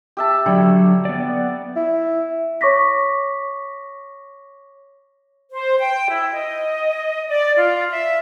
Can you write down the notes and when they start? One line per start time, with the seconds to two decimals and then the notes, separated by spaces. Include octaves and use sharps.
0.17 G4 E5 A5
0.46 D3 F#3 G3
1.05 B3 D5
1.76 E4
2.61 C#5 C#6 D6 A#6 B6
5.52 C5
5.80 G5
6.09 E4
6.33 D#5
7.28 D5
7.57 F4
7.91 E5